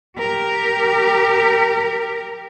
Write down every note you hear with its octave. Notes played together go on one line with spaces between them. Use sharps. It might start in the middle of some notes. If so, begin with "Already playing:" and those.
G4 A#4